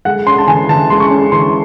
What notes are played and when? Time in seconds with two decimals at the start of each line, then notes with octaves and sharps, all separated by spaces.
0.05 G#3 F#5
0.27 C#4 C6
0.38 A5
0.47 E3 G#5
0.69 E3 A5
0.90 G#3 C6
1.00 C#6
1.10 C#4
1.32 E3 C6